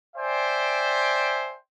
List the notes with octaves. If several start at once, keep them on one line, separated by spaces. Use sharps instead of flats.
C5 D5 E5 G5 G#5